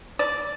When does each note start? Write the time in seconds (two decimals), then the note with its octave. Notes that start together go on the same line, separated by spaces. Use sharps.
0.19 D5